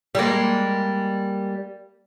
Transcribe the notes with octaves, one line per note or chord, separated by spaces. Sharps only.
G3 G#3 A#3